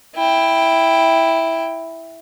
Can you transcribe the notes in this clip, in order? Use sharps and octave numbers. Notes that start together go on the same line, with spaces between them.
E4 G5